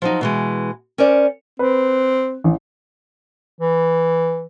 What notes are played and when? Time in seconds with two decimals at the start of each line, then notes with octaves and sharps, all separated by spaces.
0.02 F3 F#3 D#4
0.21 B2 E3 G#3
0.98 C#4 A#4 C5 D5
1.59 C4 B4
2.44 A1
3.60 E3